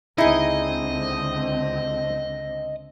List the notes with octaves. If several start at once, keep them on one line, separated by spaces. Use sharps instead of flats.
C#2 D3 C4 D#4 E4 G#4 D#5